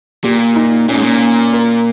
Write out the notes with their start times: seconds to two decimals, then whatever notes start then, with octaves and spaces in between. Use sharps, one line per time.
0.24 A#2 G4
0.56 D#4
0.89 A#2 C#4
0.95 G#2
1.02 A#2
1.53 A#4